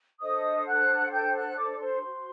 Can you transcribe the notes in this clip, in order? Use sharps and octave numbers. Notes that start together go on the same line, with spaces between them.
D4 A4 C5 D#5 D#6
F#5 F#6
G5 G6
F#5 F#6
D5 D6
D6
C5 C6
F#4 C5